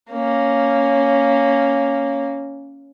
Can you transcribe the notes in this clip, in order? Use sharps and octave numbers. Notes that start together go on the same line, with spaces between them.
A#3 C#4